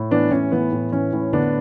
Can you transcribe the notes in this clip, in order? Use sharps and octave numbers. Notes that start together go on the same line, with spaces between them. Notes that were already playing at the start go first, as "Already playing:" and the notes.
Already playing: A2
E3 B3 D4
A2 C#4
E3 B3
A2
E3 C#4
A2
D3 B3 D4